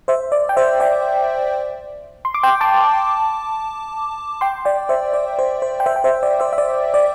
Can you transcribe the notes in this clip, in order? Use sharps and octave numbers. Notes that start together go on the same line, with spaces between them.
C5 E5
D5
G5
C5 E5
D5 G5
C6
D6
G5 C6
A5 D6
G5 C6
D5 G5
C5 E5
D5
C5
C5
G5
C5 E5
G5
C5 E5
D5
C5 E5
E5
D5
D5